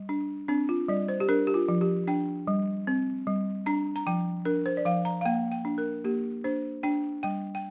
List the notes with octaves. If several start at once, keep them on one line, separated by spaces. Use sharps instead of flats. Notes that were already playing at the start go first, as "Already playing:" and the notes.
Already playing: G3
D4
C4 D4
F4
G3 D5
C5
G4
D4 A#4
G4
F4
F3
G4
D4 G5
G3
C4
G3
D4 A#5
A#5
F3 G5
D4 A#4
C5
D5
F3 F5
A#5
F5
A#3 G5
G5
D4
A#4
A#3 G4
D4 C5
D4 G5
G3 G5
G5